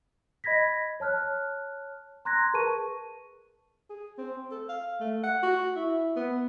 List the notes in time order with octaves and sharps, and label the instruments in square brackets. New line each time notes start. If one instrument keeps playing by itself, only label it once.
[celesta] D#5 B5 G#6 A#6 B6
C#5 A5 F6 F#6
A#5 C6 F#6 G#6 A#6
G#4 A#4 B4 A5 C#6 D#7
[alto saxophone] G#4
C4
A4
F5
A3
F#5
F#4
E4
B3